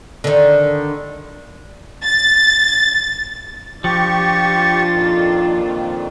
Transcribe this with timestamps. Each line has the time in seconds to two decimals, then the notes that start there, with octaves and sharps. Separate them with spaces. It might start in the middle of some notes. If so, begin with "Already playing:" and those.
0.24 D3 D#3
2.04 A6
3.84 F3 D4 F4 G4 C#6 A6
4.94 F2 A#2 D#3